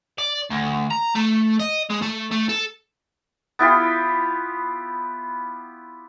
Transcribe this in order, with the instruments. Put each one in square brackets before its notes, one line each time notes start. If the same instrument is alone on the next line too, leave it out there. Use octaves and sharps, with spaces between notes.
[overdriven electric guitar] D5
D2
A#5
A3
D#5
G#3
A3
A3
A4
[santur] B3 E4 F4 G4